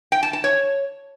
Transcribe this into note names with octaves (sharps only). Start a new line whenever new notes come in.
G5
A5
A5
C#5